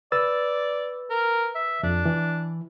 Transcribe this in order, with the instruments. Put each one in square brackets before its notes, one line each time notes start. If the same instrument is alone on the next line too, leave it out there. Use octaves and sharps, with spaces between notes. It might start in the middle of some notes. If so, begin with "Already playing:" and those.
[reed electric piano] B4 E6 A6 [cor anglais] D5
[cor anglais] A#4
E5
[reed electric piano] F2 [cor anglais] D4
[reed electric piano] E3